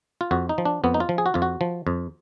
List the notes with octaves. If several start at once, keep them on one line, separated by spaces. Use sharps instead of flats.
F4
F2 F#4
D#4
F3
D4
F2 B3
D#4
F4
F3
G#4
F#4
F2 F4
F#4
F3
F2